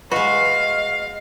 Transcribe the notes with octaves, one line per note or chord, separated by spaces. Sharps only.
G#3 F#4 B4 D#5 F5